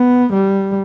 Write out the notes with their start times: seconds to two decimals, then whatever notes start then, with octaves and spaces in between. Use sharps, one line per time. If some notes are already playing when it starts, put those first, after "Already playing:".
Already playing: B3
0.33 G3